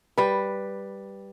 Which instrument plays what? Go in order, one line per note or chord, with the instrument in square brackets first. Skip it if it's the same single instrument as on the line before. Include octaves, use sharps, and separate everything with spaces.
[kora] G3 B4